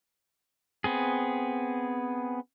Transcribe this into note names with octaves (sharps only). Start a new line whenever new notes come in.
B3 C4 G#4